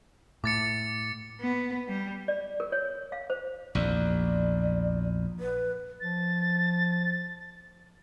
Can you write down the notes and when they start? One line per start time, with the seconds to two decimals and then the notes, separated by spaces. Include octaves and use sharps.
0.44 A2 D6 A6 C#7
1.41 B3
1.88 G3
2.28 D5
2.60 A#4
2.72 C#5
3.12 F5
3.30 C5
3.75 A#1 E2 D5
5.39 B4
6.01 F3 A6